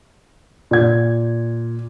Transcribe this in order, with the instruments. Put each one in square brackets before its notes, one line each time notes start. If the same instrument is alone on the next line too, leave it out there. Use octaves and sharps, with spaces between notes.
[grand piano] A#2 G#6